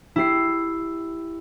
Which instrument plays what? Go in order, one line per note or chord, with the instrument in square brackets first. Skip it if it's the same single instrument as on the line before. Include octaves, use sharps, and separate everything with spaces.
[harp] E4 G4 C7